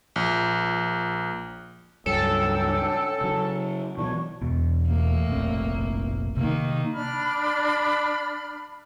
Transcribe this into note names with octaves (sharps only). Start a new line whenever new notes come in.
A#1
C#2 G2 F#3 C#4 D4 A4 G5 E6
C#3 F#3
B2 E3 F#3 D4 C#5 C#6
E2 B2
A2 A#3
F1 A#1 C4
C3 D#3 A#3
D4 B5 F6